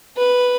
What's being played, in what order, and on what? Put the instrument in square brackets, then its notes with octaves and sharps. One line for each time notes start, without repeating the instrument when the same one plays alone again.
[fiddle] B4